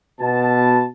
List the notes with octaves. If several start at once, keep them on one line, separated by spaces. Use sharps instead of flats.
B2 A5